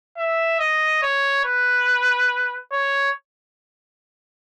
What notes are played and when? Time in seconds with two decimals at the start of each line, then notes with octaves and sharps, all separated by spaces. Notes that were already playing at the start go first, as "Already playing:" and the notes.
0.17 E5
0.60 D#5
1.02 C#5
1.45 B4
2.72 C#5